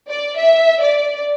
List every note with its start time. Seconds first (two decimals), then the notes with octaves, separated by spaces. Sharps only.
0.09 D5
0.37 E5
0.81 D5